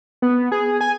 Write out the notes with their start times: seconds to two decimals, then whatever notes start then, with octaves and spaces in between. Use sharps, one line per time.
0.22 B3
0.52 G#4
0.81 G#5